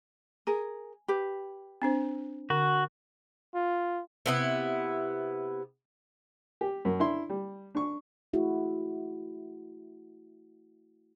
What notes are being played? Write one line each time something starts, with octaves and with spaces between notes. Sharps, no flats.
G#4 A#4 G#5
G4 B4
C4 D4 C5
D3 F#4
F4
C3 B3 E4
G4
F#2
D4 E4 C6
G3
D4 C#6
A3 E4 F#4 G#4